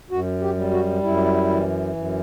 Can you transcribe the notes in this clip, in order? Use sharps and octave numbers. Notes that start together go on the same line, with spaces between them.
F#2 F#4
G4
G3
F#4
F#2 E4
E3
F#2